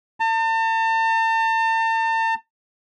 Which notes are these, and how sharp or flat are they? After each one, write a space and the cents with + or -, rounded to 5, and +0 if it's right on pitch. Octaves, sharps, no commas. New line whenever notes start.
A5 +40